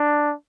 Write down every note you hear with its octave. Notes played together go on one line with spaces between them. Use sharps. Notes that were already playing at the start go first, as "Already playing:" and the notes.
Already playing: D4